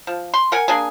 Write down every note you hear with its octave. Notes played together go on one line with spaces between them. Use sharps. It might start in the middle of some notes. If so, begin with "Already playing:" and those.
F3
C6
A#4 F#5 G#5
A#3 D4 G#4 G#5